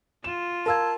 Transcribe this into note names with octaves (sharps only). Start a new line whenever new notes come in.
F4 E7
A#4 F5 A5 C6 E6 G#6